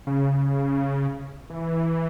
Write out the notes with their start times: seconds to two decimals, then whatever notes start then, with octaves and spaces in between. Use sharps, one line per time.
0.07 C#3
1.50 E3